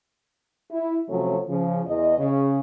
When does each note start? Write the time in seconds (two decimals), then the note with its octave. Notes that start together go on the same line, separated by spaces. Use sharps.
0.71 E4
1.09 C3 F3 F#3 A3 C#4
1.48 C#3 F3
1.86 E2 D#5
2.19 C#3